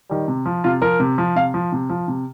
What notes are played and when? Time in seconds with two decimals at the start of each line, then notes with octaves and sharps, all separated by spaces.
0.09 D#3 G3
0.28 C3
0.45 F3
0.64 C3 F4
0.81 F3 A#4
1.00 C3
1.18 F3
1.36 C3 F5
1.54 F3
1.72 C3
1.89 F3
2.08 C3